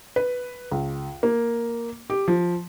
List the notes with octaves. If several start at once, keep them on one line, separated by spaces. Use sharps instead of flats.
B4
C#2
A#3
G4
F3